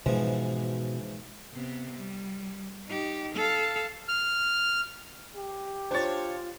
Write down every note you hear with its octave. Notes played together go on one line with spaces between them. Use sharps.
G#2 B2 E3 F3
C3 B3
G3
D#4 G4
A4 F5
F6
G4
D4 F4 C5 C#5 A6